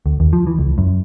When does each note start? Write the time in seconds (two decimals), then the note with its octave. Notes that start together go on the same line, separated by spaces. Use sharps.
0.06 D2
0.20 D#2
0.33 F3
0.47 E3
0.58 C#2
0.78 F#2